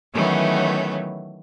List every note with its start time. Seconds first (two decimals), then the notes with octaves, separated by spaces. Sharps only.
0.13 D#3 E3 F#3 A3 B3 C#4